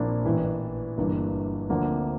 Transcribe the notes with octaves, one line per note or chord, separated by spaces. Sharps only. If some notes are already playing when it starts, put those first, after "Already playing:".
Already playing: A#1 A#2 F3 A#3 C4 D4 E4
A1 A2 E3
G1 G2 E3 A#3
D2 D3 F3 A#3
C4